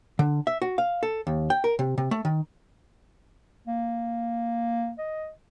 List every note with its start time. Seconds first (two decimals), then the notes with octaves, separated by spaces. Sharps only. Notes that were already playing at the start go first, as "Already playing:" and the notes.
0.19 D3
0.47 E5
0.62 F#4
0.78 F5
1.03 A4
1.27 D#2
1.50 G5
1.64 A#4
1.79 C3
1.98 C3
2.11 A3
2.25 D#3
3.67 A#3
4.98 D#5